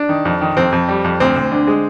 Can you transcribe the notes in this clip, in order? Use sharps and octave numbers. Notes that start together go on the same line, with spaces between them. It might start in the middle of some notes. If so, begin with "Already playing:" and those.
Already playing: D4
D#3
F2
D#3
F2 C4
F2
G3
F2
D2 C4
D2
D3
G#3